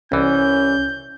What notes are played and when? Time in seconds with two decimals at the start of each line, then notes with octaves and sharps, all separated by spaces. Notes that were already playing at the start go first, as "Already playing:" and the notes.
0.12 C2 E3 C#4 G6